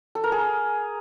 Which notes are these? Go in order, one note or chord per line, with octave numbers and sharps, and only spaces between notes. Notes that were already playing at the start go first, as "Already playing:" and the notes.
A4
A#4
G#4